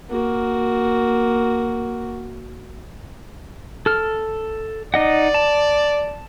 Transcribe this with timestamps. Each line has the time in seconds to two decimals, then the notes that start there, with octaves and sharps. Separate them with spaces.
0.10 A#3 F#4
3.86 A4 F6
4.94 D#4 D5 D#5 F#5
5.34 A5